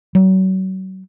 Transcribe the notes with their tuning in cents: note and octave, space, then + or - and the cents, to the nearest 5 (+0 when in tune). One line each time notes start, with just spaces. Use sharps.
F#3 +35